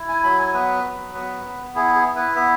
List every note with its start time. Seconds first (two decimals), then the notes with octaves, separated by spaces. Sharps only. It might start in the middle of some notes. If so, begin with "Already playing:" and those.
Already playing: E4
0.09 G#5
0.24 F#3 B5
0.39 G#5
0.54 B3 B4
0.84 F#3
1.15 B3
1.45 B3
1.75 E4 G#4
1.96 G#4
2.06 E4
2.16 B4
2.36 B3 E5